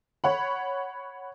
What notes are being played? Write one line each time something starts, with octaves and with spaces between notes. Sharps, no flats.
C#5 F#5 B5